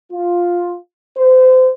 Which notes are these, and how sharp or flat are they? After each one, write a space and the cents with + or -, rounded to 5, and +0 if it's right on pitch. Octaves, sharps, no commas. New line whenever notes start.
F4 +5
C5 -30